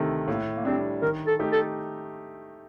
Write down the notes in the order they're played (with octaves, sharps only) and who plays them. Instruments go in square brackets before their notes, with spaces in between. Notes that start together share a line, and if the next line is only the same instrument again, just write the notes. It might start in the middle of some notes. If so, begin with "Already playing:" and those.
Already playing: [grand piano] D2 C3 D#3 A3
[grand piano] A2 [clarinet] A#3
[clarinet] A#3
[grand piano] G3 D4 [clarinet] C4
[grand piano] D#3 [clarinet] A#4
[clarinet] A4
[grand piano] A3 D#4 G4
[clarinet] A4